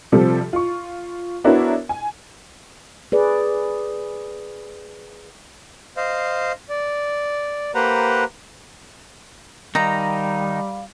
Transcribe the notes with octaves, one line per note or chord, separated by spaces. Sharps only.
C3 F3 G3 A4
F4 C#6
B3 D4 E4 F#4 A#4 C#5
G#5
G#4 B4 D5
C5 D#5 F5
D5
A#3 G4 B4 C5 F#5 A#5
D#3 G3 D#4 F5 A#5